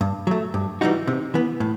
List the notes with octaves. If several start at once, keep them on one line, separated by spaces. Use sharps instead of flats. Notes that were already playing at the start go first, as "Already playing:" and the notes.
G2
F#3 A3
G2
E3 G3 D#4 F#4
C3
E3 B3
A2